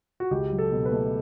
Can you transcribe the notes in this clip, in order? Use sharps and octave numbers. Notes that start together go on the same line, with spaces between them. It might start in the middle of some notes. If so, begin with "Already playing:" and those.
F#4
C#2 G4
F#3
A4
B2
B4
A3